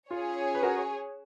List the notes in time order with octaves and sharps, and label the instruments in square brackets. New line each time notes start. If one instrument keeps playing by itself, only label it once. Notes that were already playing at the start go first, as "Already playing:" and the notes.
[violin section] C#4 G#4 C#5 [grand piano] F4
[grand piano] B4
F#4 A#4